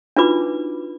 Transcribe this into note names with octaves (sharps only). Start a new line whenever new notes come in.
D4 D#4 F4 F#4 B4 D6